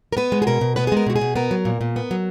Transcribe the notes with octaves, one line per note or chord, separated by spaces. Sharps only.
A#4
B3 B4
G#3
G#4
B2 A#4
B2
B3 B4
G#4
G#3 A#4
B2 F#4
G#4
B2
B3 A#4
F#3
A#2
A#2
B3
F#3